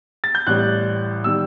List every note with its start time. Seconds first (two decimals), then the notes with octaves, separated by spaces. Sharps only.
0.24 A6
0.35 G6
0.47 A1 A2 G3 F#6
1.24 D#3 G3 E6